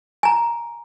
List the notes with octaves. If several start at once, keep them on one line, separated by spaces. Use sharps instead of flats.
G#5 A#5